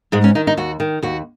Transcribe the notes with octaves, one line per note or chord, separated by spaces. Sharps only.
G#2 G#3
C#4
D#3 D#4
D#4
D#2 F#4
D#3
D#2 F#4